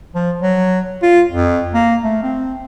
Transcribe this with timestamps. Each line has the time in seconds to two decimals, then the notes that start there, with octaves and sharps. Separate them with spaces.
0.15 F3
0.42 F#3
1.02 F4
1.32 F2
1.74 A#3
2.04 A3
2.23 C4